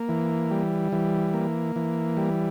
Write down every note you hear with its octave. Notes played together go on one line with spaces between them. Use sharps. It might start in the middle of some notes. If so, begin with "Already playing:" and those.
Already playing: A#3
E3
G3
E3
A#3
E3
G3